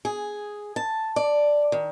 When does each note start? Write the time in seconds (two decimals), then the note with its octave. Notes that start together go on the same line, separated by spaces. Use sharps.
0.05 G#4
0.76 A5
1.16 D5
1.72 D#3